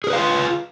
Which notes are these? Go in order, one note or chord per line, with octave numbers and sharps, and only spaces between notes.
F4 G#4 A#4 B4 F5